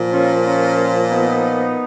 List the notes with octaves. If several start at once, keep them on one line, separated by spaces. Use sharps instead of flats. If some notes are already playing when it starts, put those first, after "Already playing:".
Already playing: A#2 F3
C#4 F4
C#4 F4
B3 D#4